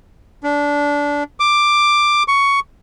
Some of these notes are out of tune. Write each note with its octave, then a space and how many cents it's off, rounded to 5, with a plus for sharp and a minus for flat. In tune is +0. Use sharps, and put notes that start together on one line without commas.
D4 -20
D6 +10
C#6 +10